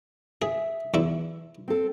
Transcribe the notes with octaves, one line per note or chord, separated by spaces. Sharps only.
G#4 E5
E2 E4
C4 A4